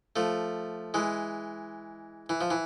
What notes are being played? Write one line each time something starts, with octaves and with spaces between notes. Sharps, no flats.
F3 A3
E3 G#3
E3
F3
E3